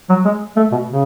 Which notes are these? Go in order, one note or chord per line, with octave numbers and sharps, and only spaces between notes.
F#3
G#3
A3
B2
C#3